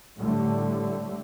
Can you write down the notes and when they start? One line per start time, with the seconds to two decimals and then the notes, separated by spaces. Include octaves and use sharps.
0.18 A2 D3 G3 A3